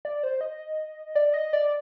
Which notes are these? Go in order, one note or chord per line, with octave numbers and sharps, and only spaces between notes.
D5
C5
D#5
D5
D#5
D5